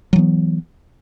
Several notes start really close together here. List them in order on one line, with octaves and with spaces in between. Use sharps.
F#3 E3 B3